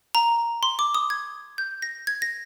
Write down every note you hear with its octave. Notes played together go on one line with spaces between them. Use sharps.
A#5
C6
D6
D#6
G#6
G6
A#6
G#6
A#6